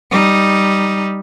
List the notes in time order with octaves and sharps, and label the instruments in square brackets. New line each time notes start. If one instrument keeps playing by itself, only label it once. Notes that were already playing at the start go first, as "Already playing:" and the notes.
[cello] G3 D#4